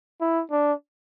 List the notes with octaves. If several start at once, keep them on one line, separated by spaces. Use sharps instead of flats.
E4
D4